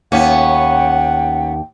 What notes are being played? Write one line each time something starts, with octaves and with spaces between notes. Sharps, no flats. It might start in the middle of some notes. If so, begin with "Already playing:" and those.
D#2 B3 C#4 F#5 G5